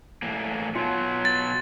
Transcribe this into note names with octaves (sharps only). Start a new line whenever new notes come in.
A2 E3 A#3
B2 F#3 F4
A6